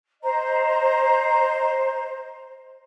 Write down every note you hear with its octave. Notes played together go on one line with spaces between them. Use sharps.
C5 D#5 A#5